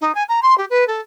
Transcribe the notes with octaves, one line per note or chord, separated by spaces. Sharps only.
D#4
G#5
A#5
C6
G4
B4
A4